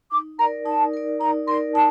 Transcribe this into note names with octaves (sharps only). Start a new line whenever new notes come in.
D#4 D6
A#4 D5 A#5
D#4 A5
A#4 D5
D#4 A#5
A#4 D5 C6
D#4 A5